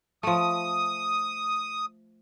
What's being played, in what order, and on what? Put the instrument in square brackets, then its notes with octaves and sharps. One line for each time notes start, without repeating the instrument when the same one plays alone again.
[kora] F3 A3 [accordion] D#6